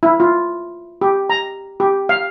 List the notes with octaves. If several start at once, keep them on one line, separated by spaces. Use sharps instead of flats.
E4
F4
G4
A#5
G4
F5